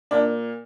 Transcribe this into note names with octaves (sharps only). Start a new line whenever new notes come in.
A#2 D4